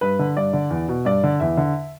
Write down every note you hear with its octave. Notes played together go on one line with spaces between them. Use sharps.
G2 B4
D3
G2 D5
D3
E2
B2
G2 D5
D3
E2 E5
D3